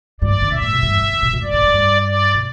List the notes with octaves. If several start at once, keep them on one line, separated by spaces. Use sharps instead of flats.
G2 D5
E3
D3
B2 E5
A2
B2
G2
E2
G2
D3
B2
B2
G2 D5
A2
G2
G2
D5
B2